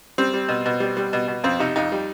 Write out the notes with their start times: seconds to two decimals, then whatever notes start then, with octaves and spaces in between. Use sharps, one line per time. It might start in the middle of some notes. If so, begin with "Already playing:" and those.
0.18 G3 C4
0.33 G3
0.49 B2
0.66 B2
0.80 G3
0.97 G3
1.13 B2
1.28 B2
1.44 F2 C4
1.59 C3 D#4
1.76 F2 D#4
1.92 G3